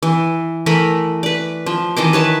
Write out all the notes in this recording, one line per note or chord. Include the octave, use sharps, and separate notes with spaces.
E3
E3 A3 A#4 B5
B4 D5
F3
D#3 E3 D#5 D6
B4 C#5 A5